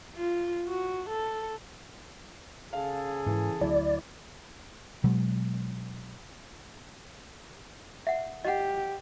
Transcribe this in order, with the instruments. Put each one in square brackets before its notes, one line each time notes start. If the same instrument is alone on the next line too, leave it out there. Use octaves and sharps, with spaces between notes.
[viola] F4
F#4
A4
[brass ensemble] C#3 G#4 A4 [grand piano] F5
[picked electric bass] G#2 [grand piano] E3
[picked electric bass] D2 F#3 [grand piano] E4 [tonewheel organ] D5
[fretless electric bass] B2 F#3 G#3
[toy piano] E5 F#5
[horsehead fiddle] G4 [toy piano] D#5 F#5